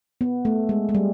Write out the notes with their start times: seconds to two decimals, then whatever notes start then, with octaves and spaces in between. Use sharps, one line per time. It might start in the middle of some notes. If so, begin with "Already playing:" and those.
0.21 B3
0.45 A3
0.69 G#3
0.89 G#3
0.95 G3